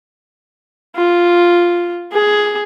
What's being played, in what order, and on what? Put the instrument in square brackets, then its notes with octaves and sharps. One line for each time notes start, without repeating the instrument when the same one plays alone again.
[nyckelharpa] F4
G#4